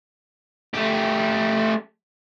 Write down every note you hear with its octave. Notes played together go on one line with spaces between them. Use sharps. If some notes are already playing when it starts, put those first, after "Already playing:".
A3 G4